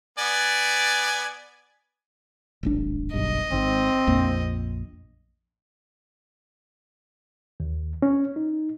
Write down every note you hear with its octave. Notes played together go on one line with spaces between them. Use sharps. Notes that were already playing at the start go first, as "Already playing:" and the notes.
B3 D5 G#5
D1 G#1 D4
F#1 B1 G2 D#5
G#1 G#2 C4
A#1 F2 A#3
D#2
C#4
D#4